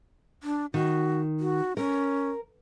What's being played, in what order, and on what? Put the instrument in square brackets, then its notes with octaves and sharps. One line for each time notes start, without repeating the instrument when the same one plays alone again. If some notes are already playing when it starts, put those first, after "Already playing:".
[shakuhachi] D4
[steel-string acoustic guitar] D#3 [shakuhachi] F#4
[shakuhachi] F#4
[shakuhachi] C#4 [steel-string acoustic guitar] A#4